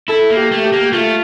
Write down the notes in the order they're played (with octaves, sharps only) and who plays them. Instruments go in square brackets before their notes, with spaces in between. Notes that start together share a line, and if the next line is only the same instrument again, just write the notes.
[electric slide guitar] E4 [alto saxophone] A4
[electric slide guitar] A#3
[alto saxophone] G4
[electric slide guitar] A3
[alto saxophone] G4
[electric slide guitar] A#3
[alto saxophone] G4
[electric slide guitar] A3 [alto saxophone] F4